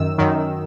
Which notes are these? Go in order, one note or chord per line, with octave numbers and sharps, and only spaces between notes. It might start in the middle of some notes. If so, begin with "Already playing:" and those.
Already playing: F#2 D#3 E6
F#2 D#3